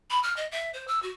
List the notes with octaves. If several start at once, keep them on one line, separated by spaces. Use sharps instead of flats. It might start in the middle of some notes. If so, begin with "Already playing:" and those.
B5
F6
D#5
E5
C5
E6
F#4